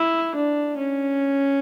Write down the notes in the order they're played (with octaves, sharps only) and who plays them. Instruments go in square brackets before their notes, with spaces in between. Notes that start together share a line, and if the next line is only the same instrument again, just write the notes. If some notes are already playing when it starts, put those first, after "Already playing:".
Already playing: [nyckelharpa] E4
D4
C#4